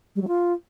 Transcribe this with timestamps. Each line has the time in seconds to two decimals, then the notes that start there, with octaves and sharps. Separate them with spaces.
0.15 G3
0.22 F#3
0.28 F4